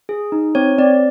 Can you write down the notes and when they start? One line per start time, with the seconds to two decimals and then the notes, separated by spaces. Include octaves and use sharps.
0.09 G#4
0.32 D#4
0.55 C4 C#5
0.78 C4 D5